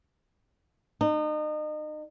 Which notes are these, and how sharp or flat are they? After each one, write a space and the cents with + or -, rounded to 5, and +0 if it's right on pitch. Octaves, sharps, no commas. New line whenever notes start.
D#4 -35